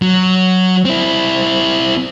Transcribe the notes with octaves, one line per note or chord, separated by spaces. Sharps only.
F#3
C4 E4